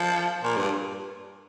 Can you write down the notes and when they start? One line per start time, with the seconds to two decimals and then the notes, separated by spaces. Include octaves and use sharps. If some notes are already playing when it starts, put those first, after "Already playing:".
Already playing: F3
0.43 A#2
0.56 G2